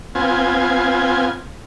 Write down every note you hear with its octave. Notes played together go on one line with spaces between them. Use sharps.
B3 C4 F4 G#5